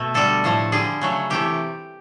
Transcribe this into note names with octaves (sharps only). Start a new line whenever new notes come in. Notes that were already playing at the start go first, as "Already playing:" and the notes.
Already playing: B2 A3
D3 G3 A4
A2 F3 A3
D3 G3 G#4
C#3 F#3 A3
C3 E3 A3 G4